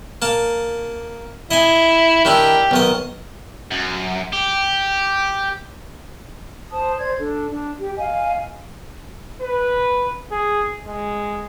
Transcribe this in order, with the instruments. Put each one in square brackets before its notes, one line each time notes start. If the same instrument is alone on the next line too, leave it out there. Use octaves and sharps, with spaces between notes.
[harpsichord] A#3 A5
[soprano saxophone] E4 [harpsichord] D#5 G#5
[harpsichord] D#3 D4 E4 [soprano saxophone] G4
[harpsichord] B1 D#3 D#5
[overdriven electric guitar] F#2
G4
[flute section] C5 A5 D#6
C5 D5 G#6
D4 A4
D4
G4
D#5 F5 G#5
[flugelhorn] B4
G#4
G#3